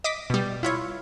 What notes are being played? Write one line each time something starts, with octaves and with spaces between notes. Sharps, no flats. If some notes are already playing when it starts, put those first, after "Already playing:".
D#5 D6 D#6 B6
B2 G3
E4 F4 C#5